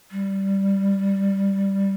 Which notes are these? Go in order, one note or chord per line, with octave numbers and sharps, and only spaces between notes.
G3